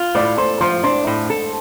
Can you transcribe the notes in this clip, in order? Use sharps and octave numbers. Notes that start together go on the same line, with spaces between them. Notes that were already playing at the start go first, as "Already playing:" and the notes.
Already playing: F4
A2 D5 D6
A4 C5 C6
F3 C5 C6
D4 C5 C6
A2
A4